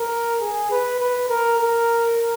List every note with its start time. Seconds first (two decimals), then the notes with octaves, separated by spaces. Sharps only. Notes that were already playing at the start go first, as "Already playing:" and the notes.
Already playing: A#4
0.40 G#4
0.71 B4
1.00 B4
1.29 A#4
1.58 A#4